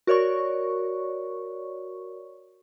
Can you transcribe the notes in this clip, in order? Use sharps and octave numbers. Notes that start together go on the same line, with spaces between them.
F#4 A#4 C#5 D5 C#6